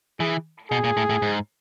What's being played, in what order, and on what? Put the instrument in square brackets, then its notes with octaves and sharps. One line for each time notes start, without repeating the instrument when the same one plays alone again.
[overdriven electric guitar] E3 [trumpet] G#4
[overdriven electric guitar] B2 [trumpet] G#4
[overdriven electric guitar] A#2
A2
A2
G#2